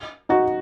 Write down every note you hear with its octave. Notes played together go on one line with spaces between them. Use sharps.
D#4 F#4